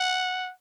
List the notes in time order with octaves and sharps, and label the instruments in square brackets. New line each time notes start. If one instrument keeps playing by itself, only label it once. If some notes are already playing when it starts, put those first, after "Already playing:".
Already playing: [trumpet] F#5